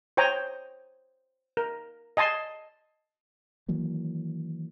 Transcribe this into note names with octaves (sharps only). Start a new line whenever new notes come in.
C5 C#5 G5 G#5 A#5
A#4
D#5 G#5 A5 C6
D#3 E3 F#3 A#3